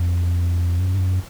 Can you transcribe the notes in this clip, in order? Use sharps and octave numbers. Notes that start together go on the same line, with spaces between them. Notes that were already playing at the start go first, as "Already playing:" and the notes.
Already playing: F2
F#2
G2
F#2